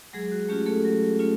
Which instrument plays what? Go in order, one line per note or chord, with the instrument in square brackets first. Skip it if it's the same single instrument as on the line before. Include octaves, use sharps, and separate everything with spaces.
[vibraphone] F#3 G#3 G#4
F#4
A3 C#4 F4 G4
A3 A4
F#3
A3 C#4 F4